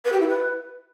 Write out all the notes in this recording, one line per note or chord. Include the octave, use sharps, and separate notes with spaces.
B4
G4
E4
B4